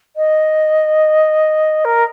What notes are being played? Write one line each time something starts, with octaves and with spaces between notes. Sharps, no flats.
D#5
A#4